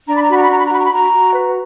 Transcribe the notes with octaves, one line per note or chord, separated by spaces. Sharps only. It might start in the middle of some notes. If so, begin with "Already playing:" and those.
D4 A#5
B5
A#5
F#4 B5
A#5
B5
D4 A#5
B5
A#5
F#4 B5
A#5
B5
F#4 A#5
F#4
B4